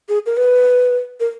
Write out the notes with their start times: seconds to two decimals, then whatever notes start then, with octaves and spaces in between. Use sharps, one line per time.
0.09 G#4
0.26 A#4
0.37 B4
1.20 A#4